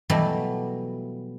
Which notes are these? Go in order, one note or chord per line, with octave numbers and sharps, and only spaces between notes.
B2 E3 F#3 G3 A3